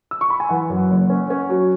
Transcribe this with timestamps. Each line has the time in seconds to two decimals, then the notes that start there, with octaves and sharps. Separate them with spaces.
0.11 E6
0.21 C#6
0.30 B5
0.40 G#5
0.49 E3 F#5
0.69 F#2
0.90 F#1
1.10 C#4
1.30 C#4
1.50 F#3